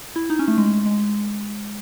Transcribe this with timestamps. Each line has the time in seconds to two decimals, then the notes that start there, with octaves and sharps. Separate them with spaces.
0.16 E4
0.30 D#4
0.39 C#4
0.48 A3
0.58 G#3
0.86 G#3